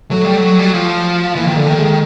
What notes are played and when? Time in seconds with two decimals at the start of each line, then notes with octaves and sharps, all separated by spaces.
0.11 F#3 A3
0.25 G3
0.37 F#3
0.59 G3
0.66 F#3
0.74 F3
1.36 E3 A#3
1.46 D#3
1.56 D3 A3
1.67 D#3
1.78 G#3